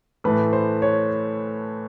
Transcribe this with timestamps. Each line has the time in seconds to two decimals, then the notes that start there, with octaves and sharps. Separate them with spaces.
0.24 A2 E3 A3 B4
0.53 C5
0.82 C#5